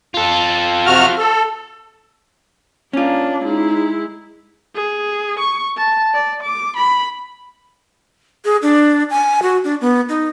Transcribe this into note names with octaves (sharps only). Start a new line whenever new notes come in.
F4 A4
C3 F#4 F6
A4
A#3 C#4 D4 F4
G#3 D#4 E4
G#4
C#6
A5
D5
D6
B5
G#4
D4
G#5
F#4
D4
B3
D#4